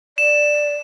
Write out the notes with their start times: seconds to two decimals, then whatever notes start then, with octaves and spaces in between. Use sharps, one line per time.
0.18 D5 E7